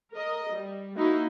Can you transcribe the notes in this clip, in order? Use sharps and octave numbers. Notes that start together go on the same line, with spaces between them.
A#4 D#5
G3
A#3 D#4 E4 F#4